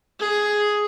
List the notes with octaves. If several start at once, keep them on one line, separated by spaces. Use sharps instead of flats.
G#4